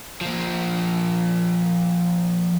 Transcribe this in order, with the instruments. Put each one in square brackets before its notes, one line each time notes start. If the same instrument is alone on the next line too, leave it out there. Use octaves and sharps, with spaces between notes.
[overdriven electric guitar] F3 A#3